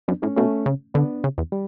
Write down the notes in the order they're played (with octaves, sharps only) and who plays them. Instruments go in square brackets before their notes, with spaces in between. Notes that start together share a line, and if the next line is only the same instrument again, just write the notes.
[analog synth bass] F#2 [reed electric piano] B3 D4
[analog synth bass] A2 [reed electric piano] A3 C#4
[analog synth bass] B2 [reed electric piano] A3 C#4
[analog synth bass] C#3
[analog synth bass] D3 [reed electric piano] B3 D4
[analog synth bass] C#3
E2
[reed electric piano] G3